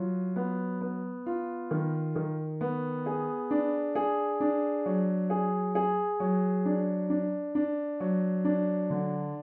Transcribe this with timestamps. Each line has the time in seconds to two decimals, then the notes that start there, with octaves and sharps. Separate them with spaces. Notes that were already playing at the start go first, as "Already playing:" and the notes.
Already playing: F#3 F4
0.36 B3
0.81 B3
1.26 F4
1.71 D#3
2.16 D#3
2.61 B3
3.06 G#4
3.51 D4
3.95 G#4
4.40 D4
4.86 F#3
5.30 G#4
5.75 G#4
6.20 F#3
6.65 D4
7.10 D4
7.55 D4
8.00 F#3
8.45 D4
8.90 D3